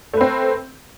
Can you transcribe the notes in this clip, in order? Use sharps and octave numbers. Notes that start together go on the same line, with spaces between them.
A3 C4 B4